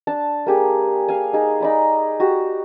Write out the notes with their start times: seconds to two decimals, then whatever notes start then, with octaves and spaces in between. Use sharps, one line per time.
0.07 D4 A5
0.46 A#3 G4 G#4
1.08 F5 G#5
1.33 D#4 G#4
1.61 D#4 D5 B5
2.20 F#4 G4